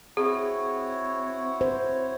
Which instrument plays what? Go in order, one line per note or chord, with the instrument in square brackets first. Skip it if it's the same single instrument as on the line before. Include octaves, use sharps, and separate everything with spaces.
[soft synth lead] C4 [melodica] E4 F#4 C#5 [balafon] G#4
[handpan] C5